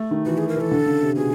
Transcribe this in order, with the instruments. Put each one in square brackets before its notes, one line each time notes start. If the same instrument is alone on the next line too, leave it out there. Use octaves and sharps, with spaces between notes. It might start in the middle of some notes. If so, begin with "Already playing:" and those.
Already playing: [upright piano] A3
D#3
[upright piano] E3 [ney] F#4
[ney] G#4
A#4
[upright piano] E3 [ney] A4
[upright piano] D3
C#3
C3
[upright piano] B2 [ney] G#4